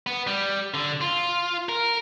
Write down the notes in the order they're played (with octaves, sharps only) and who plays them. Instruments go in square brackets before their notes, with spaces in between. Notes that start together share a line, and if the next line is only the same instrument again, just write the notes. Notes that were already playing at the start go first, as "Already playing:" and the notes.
[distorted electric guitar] B3
G3
D3
F4
A#4